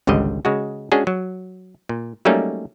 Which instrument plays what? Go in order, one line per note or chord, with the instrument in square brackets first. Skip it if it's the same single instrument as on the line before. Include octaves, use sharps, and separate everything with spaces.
[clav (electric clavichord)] G#1 C#2 D3 G3 D#5
C#3 G#3 F#4
G#3 C#4 D4 F#4 G#4
F#3
A#2
F#3 G3 A3 A#3 C#4 D#4